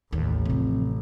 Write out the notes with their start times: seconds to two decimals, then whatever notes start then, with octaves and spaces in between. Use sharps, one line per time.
0.13 A1 D#2
0.45 C3 F3